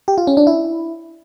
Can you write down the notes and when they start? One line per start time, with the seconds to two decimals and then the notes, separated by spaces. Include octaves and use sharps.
0.08 G4
0.18 F4
0.27 C#4
0.37 D4
0.47 E4